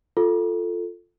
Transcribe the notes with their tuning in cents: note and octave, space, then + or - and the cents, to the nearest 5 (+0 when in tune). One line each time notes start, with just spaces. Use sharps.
F4 +0 A4 +0